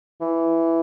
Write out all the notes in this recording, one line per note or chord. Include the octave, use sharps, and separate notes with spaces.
E3